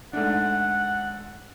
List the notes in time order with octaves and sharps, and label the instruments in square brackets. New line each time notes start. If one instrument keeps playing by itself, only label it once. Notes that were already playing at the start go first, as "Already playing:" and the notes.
[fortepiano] G#2 A3 D4 [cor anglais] F#5